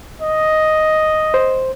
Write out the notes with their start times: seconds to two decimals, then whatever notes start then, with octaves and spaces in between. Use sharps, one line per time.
0.21 D#5
1.34 C5